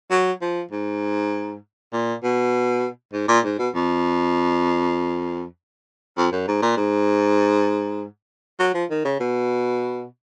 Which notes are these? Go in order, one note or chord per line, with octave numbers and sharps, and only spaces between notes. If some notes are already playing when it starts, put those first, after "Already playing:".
F#3
F3
G#2
A#2
B2
G#2
A#2
G#2
B2
F2
F2
F#2
G#2
A#2
G#2
F#3
F3
D#3
C#3
B2